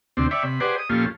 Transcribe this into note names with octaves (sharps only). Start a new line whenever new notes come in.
D2 C3 C4 D4
C#5 D5 E5 G5 B5
C3 B5
G4 G#4 B4 C5 D5 F#5
D#6
A#2 F3 C#4 F4 G4 A4